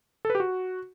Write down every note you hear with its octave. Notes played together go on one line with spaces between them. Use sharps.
A4
B4
G4
F#4